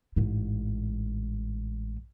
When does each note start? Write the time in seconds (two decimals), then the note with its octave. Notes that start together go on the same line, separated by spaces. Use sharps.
0.16 A1 G#2